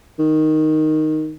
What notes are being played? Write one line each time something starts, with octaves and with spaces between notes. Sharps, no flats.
D#3